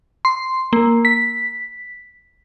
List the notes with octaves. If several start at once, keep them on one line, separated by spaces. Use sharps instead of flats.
C6
A#3
B6